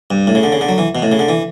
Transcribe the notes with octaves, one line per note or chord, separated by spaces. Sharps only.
G2
A2
C#3
D3
C#3
D3
F#3
E3
B2
A2
C#3
D3
E3